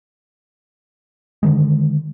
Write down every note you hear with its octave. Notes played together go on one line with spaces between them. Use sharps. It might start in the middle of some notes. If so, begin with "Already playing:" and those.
D3 D#3 G#3